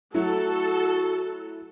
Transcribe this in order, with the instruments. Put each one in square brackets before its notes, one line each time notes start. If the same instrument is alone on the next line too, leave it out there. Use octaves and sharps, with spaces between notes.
[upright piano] F#3 A3 [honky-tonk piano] E4 [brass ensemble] F#4 [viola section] A4